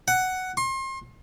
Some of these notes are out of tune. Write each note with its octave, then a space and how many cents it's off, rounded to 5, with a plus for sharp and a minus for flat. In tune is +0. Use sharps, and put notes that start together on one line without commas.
F#5 +5
C6 +35